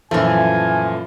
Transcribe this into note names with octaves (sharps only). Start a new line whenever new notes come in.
F#2 A#2 E3 F3 A3 G#5